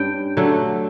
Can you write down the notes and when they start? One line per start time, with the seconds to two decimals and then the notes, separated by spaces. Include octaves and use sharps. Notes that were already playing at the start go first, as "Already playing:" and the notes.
Already playing: G2 C#4 G5
0.37 D3 F#3 A3